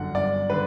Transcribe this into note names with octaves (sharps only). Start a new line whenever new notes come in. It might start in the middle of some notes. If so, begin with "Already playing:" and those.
Already playing: G1 F#2 D3 F#5
G1 D5
D3 B4